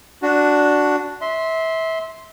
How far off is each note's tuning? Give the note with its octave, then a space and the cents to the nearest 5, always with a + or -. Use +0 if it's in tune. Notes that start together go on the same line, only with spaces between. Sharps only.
D4 +0 F#4 +0
E5 -25 C6 +0